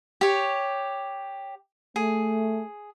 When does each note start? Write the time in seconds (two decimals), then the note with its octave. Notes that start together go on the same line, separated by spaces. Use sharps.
0.21 G4 C#5
1.96 A3 G#4